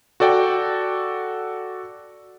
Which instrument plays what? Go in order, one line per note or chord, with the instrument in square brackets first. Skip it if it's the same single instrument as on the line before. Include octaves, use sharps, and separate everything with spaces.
[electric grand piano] F#4 A4 D5 G5